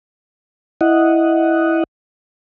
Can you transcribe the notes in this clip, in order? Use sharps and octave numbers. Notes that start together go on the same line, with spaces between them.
E4 D#5 F#5